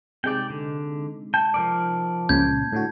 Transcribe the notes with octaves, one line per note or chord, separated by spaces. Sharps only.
C3 G#3 D#4 D5 G5
D3
G5 A5
F3 A#4 D5
C#2 A#2 C#3 G6 G#6
A2 D3 F#4